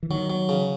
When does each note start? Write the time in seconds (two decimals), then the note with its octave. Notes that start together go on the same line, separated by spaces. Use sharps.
0.03 E3
0.10 D#3 F#3
0.30 F#3
0.49 C#3